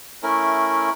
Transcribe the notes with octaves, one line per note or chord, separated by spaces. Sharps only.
A3 C#4 E4 A#4